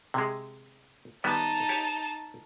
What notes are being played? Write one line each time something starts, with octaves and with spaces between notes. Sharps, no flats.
C3 G#3
D#3 G3 B3 D#4 A5
G4 C#5